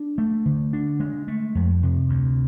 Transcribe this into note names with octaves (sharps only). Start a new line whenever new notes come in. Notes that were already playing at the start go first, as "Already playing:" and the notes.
Already playing: D4
A3
D3
D4
G#3
A3
F2
C3
D2